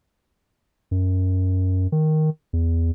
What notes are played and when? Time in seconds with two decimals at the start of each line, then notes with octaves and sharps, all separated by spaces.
0.91 F#2
1.92 D#3
2.53 E2